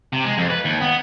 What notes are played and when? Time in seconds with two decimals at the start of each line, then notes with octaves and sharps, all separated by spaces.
0.13 C3
0.25 G#3
0.38 F2
0.50 B4
0.65 D#2
0.81 B3